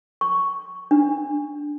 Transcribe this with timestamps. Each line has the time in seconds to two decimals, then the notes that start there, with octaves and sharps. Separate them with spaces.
0.21 C#6
0.91 D4